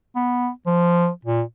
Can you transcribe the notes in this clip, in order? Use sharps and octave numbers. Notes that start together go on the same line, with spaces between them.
B3
F3
A#2